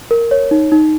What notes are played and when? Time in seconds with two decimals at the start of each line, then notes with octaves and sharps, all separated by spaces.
0.11 A#4
0.31 C#5
0.51 D#4
0.72 D#4